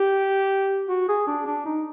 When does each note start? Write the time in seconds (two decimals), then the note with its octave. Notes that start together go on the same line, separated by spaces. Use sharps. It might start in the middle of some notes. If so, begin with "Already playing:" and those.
Already playing: G4
0.89 F#4
1.08 G#4
1.27 D4
1.46 D4
1.65 D#4